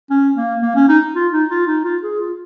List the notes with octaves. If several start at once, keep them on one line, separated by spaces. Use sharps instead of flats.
C#4
A#3
A#3
C#4
D#4
F4
D#4
F4
D#4
F4
G#4
F4